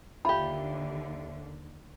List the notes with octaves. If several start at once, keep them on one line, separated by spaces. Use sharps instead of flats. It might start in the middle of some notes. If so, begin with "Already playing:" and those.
D#2 D3 F4 G4 E5 B5